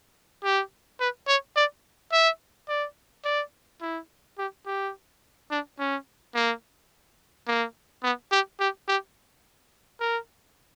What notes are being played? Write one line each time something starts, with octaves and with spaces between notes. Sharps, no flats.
G4
B4
C#5
D5
E5
D5
D5
E4
G4
G4
D4
C#4
A#3
A#3
B3
G4
G4
G4
A#4